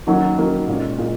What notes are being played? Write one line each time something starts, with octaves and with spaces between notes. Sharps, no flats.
D#3 F#3 A#3 C#4 F#4
D#3 F#3 A#3 C#4 F#4
A#2 G#3 C#4
A#2 G#3